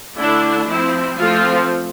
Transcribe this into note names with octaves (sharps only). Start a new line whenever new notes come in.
D3 A3 D4 E4
F3 C4 E4
F3 A3 C4 F4